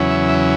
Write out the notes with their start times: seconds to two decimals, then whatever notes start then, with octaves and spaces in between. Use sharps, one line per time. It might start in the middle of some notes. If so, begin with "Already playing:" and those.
Already playing: E2 C#3 F#3 C#4 E4
0.10 E5
0.29 E5